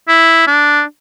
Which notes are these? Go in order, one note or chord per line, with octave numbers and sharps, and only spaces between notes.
E4
D4